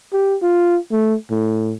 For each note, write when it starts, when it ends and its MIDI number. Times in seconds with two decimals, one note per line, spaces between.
0.13 0.36 67
0.42 0.78 65
0.91 1.15 57
1.31 1.74 45